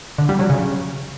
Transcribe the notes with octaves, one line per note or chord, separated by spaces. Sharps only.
D3
G3
F#3
C#3